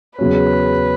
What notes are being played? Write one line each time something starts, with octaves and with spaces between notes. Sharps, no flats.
E2 C#3 F#3 C#4 B4